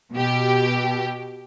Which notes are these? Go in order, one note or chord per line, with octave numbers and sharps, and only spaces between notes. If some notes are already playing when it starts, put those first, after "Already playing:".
B2 G4